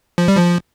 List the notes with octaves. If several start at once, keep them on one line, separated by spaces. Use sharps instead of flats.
F3
G3
F3